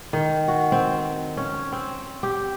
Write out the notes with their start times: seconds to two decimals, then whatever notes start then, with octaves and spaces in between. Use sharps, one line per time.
0.13 D#3
0.48 F#4
0.72 C4
1.37 C#4
1.72 C4
2.23 G4